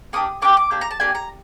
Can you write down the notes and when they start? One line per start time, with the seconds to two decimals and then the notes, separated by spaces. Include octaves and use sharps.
0.13 A#3 D4 G4 D#6
0.42 A#3 D4 G4 D6
0.57 D6
0.71 A#3 D4 G4
0.81 A#5
0.91 A5
1.00 A#3 D4 G4 G#5
1.15 A#5